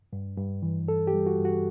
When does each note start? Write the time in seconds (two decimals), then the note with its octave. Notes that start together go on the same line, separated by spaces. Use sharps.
0.13 G2
0.37 G2
0.63 E3
0.88 G2 A4
1.07 G4
1.13 G3
1.26 F#4
1.39 G2
1.45 F#4